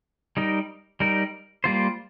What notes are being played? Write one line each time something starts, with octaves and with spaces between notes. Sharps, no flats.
G3 D#4 A#4
G3 D#4 A#4
G3 A#3 F4 C5